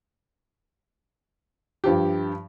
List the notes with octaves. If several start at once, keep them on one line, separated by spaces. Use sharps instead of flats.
G2 F3 G4